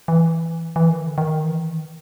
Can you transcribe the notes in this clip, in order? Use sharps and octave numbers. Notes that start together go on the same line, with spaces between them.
E3
E3
D#3
D3
D#3
E3
D#3